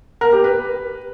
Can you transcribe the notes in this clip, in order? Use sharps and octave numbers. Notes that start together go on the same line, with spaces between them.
A#4
G4
B4